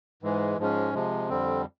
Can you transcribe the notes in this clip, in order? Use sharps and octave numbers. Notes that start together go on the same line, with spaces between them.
G#2 E3 G#3
G#2 F3 G#3 C#4
C3 F3 G#3
F2 D3 G3 C4